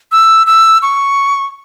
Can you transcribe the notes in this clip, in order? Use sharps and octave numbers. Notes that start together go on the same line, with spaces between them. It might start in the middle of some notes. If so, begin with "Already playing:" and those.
E6
E6
C#6